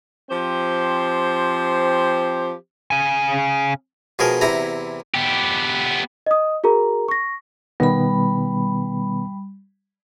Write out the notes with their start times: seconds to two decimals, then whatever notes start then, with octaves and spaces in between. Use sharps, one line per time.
0.30 F3 C4 G4 C5
2.91 C#3 G#5
4.19 B2 F3 G#4 A#4
4.41 E2 C3 E4 A#5
5.15 B3 G4
6.26 D#5 D#6
6.64 F#4 G#4 A#4 A#5
7.08 C#6 A#6
7.80 B2 D#3 G3 B3 B5